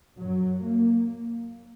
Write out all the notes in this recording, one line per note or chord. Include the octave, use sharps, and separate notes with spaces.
F#2 F#3
A#3